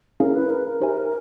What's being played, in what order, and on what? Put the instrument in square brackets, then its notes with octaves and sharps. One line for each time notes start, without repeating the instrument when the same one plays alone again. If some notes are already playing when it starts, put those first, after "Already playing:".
[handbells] C#4 E4 G#4 C#5 F5 [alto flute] A#4
[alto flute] B4
A#4
[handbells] D#4 G4 C5 E5 G#5